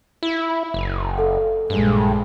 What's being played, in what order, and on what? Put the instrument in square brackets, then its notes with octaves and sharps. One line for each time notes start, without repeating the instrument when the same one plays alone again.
[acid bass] E4
F#1
[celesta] A4
[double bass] A#1 G#3 [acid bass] G2